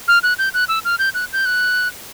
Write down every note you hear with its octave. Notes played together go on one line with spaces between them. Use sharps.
F6
F#6
G6
F#6
E6
F6
G6
F#6
G6
F#6